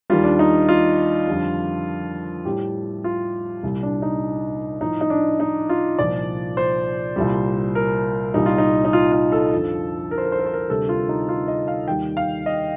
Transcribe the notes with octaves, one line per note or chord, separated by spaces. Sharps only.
D#2 D#3 G3 F4
D4
D#4
F4
F2 D3 G3
A2 G3 G4
F4
C2 A#2 G3
D4
D#4
A2 F3 D#4
D#4
D4
D#4
F4
C2 A#2 F3 D5
C5
C2 A#2 G3
A#4
C2 A#2 G3 D#4
F4
D#4
D#4
F4
F4
A4
F2 D3 F3
A#4
C5
A#4
C5
A#4
C5
A#4
D2 C3 G3 A4
F4
D#4
F4
D#5
F5
D#2 D#3 G3 G5
F5
D#5